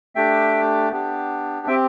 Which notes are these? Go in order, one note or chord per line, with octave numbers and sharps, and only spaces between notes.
A3 D4 G4 E5 G5
B3 D4 G4
C4 G4 E5 G5